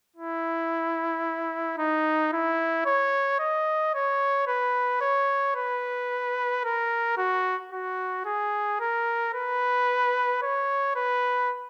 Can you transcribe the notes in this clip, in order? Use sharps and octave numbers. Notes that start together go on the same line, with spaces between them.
E4
D#4
E4
C#5
D#5
C#5
B4
C#5
B4
A#4
F#4
F#4
G#4
A#4
B4
C#5
B4